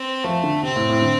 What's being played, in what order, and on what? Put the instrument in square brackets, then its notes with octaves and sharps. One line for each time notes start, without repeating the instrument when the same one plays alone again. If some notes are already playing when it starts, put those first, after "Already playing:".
Already playing: [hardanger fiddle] C4
[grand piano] F3 [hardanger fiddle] A3
[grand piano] D3
[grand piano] C3 [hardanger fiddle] C4
[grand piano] A2
A2
D3